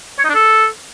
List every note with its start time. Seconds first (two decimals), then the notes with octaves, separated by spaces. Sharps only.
0.19 C#5
0.24 D#4
0.29 D4
0.35 A4